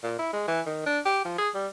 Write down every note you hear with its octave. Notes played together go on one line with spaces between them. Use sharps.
A#2
E4
G#3
E3
D#3
D4
G4
F3
G#4
G3